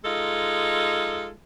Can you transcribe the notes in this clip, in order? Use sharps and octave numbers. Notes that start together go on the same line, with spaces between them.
G#3 D#4 F4 A4